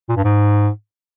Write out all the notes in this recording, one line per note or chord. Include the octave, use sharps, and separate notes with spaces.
A#2
G2
G#2